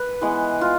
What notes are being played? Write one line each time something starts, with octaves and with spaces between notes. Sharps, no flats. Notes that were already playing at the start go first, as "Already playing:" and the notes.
Already playing: B4
E3 G#3 B3
F4